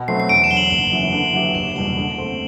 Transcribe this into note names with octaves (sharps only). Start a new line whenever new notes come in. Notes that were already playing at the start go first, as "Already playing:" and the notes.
Already playing: B2
F#3 A3 C4 C7
C7
E2 D7
E7
D3 F#3 G7
F#7
F#1 F#7
F#2 E3 B3 E4
D3
F#3 B3 E4 G4
F#1 E7
E2 B2 G3 F#7
D3
A3 C4